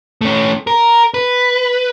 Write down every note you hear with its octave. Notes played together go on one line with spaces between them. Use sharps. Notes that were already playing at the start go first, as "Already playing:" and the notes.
A3 C#4
A#4
B4